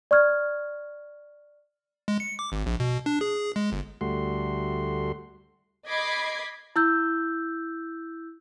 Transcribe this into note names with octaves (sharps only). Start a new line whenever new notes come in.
D5 C#6 F6 G#6
G#3
C#7
D6
G#1
A#1
B2
D4
G#4
G#3
G1
D2 G3 A3 F#4 C6
D#5 B5 D6 G#6 B6 C7
E4 E6 G6